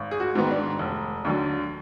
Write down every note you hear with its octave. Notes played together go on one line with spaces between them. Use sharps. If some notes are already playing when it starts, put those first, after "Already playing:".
Already playing: G#1
G#4
F#4
G#2 D#3 B3
D4
F1
D#2 D3 F#3